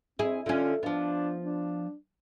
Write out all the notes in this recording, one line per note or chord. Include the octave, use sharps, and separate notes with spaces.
C4 E4 G#4
D3 C#4 F4
F3 B3 D4
D4